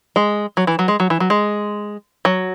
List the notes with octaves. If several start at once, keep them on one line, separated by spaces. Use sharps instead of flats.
G#3
F#3
E3
F#3
G#3
F#3
E3
F#3
G#3
F#3